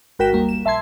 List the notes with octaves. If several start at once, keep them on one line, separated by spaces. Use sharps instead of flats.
G#1 F#4 A#4 G5 B6 E7
D#2 G3 A#3
E7
A#1 E5 A5 C6 G#6